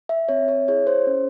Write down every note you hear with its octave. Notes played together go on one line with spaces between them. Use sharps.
E5
C4 C#5
C#5
E4 G#4 C#5
C5
C#4